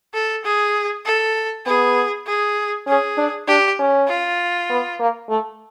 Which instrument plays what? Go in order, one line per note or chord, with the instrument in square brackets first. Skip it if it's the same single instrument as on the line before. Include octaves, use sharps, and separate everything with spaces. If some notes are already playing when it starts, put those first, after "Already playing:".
[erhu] A4
G#4
A4
[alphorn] B3 [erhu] G#4
[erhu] G#4
[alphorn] C#4 [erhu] G#4
[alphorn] D4
[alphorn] D4 [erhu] G4
[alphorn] C#4
[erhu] F4
[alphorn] B3
A#3
A3